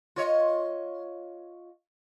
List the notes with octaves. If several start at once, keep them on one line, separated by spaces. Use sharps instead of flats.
F4 C#5 D#5